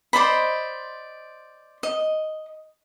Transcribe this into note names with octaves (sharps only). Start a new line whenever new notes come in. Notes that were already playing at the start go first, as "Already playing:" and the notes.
C5 D5 D#5 B5
D#5